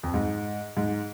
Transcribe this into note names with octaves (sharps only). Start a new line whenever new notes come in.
F2
G#2
G#2